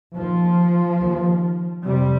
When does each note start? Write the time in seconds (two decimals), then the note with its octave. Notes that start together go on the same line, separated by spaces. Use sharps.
0.15 D#2 F3
1.00 D#2
1.86 F2 C3 G3